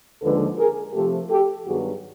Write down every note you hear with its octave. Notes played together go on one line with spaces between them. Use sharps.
D#2 D3 F3 G#3 A4 B4
G#4 A#4
C3 F3 A3 G4 A4
G4 A4
G2 D#3 F#3 B3 F#4 G#4